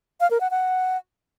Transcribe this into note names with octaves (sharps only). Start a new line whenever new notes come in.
F5
A#4
F#5
F#5